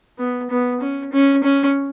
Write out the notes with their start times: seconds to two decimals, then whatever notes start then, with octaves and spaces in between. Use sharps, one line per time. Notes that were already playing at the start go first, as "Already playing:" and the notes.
0.19 B3
0.50 B3
0.81 C#4
1.13 C#4
1.44 C#4